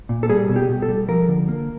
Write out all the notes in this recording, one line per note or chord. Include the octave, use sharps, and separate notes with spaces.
A#2
A4
G3 G#4
B2
G4
B2
A4
G3
F3 A#4
D3
A#3